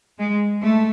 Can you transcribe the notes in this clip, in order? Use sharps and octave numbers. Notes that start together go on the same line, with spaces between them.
G#3
A3